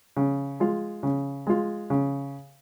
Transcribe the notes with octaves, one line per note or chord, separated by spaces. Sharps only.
C#3
G#3 F4
C#3
G#3 F4
C#3